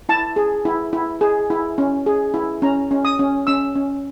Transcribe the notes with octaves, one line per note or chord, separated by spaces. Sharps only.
E4 A5
G#4
E4
E4
G#4
E4
C#4
G#4
E4
C#4 A#5
C#4
D#6
C#4
C#4 E6
C#4